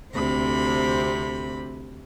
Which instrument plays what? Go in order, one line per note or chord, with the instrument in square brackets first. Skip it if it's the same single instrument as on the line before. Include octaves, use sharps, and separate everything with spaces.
[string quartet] D2 C3 C4 B5